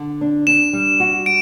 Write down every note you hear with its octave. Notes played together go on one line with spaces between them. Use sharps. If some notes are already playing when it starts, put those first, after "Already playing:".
Already playing: D3
D4
D4 E7
G3
F#4
D7